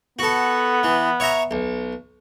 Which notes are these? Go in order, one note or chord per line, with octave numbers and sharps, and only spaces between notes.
B3 F#4 A4
E3
C#5 E5 A#5
B1